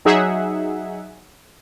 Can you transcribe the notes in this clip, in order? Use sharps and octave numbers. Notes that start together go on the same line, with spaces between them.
F#3 D#4 G#4 E5 F#5